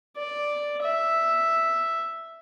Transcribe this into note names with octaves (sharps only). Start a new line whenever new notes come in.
D5
E5